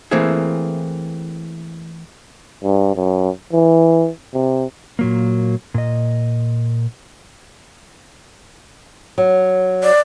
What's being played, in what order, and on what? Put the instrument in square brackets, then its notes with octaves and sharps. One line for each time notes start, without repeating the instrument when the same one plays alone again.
[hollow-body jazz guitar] E3 A3 A#3 C4 E4 G#4
[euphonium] G2
F#2
E3
C3
[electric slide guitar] A#2 F#3 A#3
A#2 D#5
[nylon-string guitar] F#3
[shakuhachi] D5